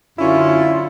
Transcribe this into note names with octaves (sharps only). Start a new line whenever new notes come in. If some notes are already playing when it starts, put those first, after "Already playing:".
F#2 D3 C#4 E4 F4